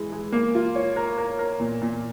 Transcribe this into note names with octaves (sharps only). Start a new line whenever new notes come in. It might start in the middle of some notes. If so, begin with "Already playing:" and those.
Already playing: E3 G#3
G#3
A#3
F4
C#5
A#4
A#4
A#4
A#2
A#2